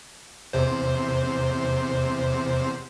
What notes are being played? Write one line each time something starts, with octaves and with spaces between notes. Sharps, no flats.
E2 C3 C5